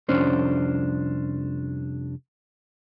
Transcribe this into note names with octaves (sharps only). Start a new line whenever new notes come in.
C2 F2 C#4 D4 C5